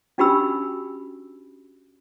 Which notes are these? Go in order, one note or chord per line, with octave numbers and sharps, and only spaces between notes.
C#4 D4 F#4 G4 B5 E6